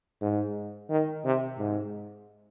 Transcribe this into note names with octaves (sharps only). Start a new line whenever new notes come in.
G#2
D#3
C3
G#2